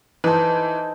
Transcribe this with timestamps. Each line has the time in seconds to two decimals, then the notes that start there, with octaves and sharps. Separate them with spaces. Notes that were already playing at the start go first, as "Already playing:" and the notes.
0.24 E3 D#4 A4 B4 C5 A5